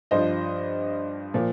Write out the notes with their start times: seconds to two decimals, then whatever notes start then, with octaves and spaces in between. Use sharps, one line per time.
0.11 G2 F3 C5 D#5
1.34 A#2 F3